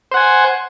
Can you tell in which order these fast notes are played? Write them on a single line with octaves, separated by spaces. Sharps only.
C5 F#5 G#5